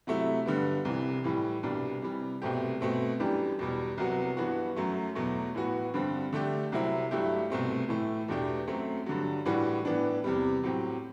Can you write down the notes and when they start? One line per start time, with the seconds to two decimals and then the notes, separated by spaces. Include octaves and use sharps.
0.07 C3 F#3 A3 E4
0.46 G2 D3 G3 B3
0.85 C2 C3 E3
1.24 A2 E3 G3
1.63 C2 B2 G3 D4
2.02 C3 E3 G3
2.42 C2 B2 A3 C4 G4
2.81 B2 A3 C4
3.19 F#2 E3 G3 D4 G4
3.59 E2 B2 G3
3.98 C2 C3 F#3 B3 F#4
4.37 G2 E3 B3 F#4
4.76 F#2 F#3 A3
5.15 E2 B2 F#3 A3
5.55 A2 E3 B3 F#4
5.94 G2 D3 G3 C4
6.33 D3 A3 D4 G4
6.72 C2 C3 F#3 C4 E4
7.11 G2 F#3 A3 E4 G4
7.50 C2 B2 A3 C4
7.89 A2 E3 A3
8.28 E2 B2 A3 D4 G4
8.67 F#2 F#3 A3 C4
9.06 G2 D3 F#3
9.45 A2 E3 G3 D4 F#4
9.85 A2 E3 B3 D4
10.24 E2 C3 G3
10.63 A2 F#3 C4 G4